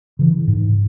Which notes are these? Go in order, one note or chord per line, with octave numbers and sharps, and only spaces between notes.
C#3 E3
G#2